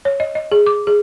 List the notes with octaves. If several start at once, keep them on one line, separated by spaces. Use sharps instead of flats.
C#5
D#5
D#5
G#4
D6
G#4